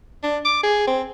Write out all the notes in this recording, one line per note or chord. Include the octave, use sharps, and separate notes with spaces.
D4
D6
G#4
C4